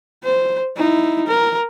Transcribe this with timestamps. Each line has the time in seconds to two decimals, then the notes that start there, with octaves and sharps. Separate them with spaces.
0.24 C5
0.77 D#4 E4
1.27 A#4